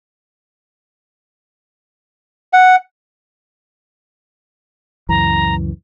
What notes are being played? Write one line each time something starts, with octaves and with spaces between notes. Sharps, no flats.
F#5
C#2 F#2 E3 A#5